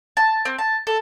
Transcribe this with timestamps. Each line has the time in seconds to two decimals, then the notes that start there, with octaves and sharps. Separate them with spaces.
0.17 A5
0.45 C4
0.58 A5
0.87 A4